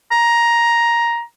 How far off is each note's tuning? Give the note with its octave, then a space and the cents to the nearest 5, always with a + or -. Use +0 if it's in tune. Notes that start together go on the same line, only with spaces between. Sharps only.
A#5 +10